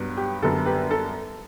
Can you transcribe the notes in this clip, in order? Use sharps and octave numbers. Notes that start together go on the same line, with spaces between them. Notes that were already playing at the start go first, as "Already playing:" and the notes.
Already playing: G2 F#3 B3
G4
F#2 D3 G3 B3 A4
G4 B4
A4